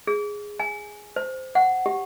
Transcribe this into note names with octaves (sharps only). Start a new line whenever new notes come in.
G#4
G#5
C5
F#5
G4